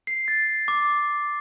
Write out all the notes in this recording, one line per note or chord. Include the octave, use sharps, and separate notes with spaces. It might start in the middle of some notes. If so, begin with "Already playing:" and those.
C7
A6
D6